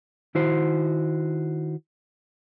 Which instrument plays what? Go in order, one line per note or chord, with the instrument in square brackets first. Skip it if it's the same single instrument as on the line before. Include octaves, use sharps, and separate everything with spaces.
[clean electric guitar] D#3 E4 F#4 C5